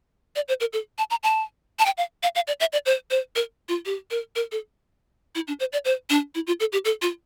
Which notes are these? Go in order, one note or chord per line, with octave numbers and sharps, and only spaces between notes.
D5
C5
A#4
A4
A5
A#5
A5
A5
G5
F5
F5
F5
D5
E5
D5
C5
C5
A#4
F4
G4
A#4
A#4
A4
E4
D4
C5
D5
C5
D4
E4
F4
A4
G4
A4
F4